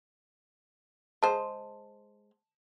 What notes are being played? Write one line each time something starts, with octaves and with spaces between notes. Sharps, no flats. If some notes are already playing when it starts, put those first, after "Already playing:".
G#3 C5 A5